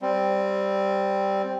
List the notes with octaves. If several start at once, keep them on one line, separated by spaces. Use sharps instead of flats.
G3 C4